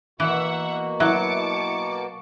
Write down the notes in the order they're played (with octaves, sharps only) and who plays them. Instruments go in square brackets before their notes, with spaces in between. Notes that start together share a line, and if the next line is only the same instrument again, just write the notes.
[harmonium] B2 A#3 F#4 [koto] E3 [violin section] E5 F#5
[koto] F#3 [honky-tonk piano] E4 [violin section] A5 D6 C#7